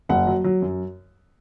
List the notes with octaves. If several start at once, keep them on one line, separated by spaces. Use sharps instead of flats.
F#1 F#5
F#3
F#3
F#2